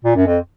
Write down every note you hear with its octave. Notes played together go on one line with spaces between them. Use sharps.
A#2
F#2
F2